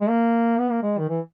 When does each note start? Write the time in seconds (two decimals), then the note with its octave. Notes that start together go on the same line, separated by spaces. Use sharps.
0.01 G#3
0.09 A#3
0.59 B3
0.71 A#3
0.83 G#3
0.98 D#3
1.09 E3